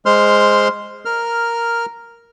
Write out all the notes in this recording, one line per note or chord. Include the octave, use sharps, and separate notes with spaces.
G#3 C5 C6 F6
A#4 F6